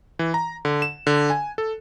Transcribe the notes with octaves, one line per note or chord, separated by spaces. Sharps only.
E3
A#5
D3
E7
D3
G#5
A4